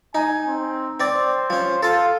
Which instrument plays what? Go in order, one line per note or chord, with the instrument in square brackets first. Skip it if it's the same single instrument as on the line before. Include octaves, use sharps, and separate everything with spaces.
[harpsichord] D#4 [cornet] G#5
[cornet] C4
[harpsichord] C4 D5 [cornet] C5
[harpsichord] F3 C#4
[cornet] F4 [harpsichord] A4 A5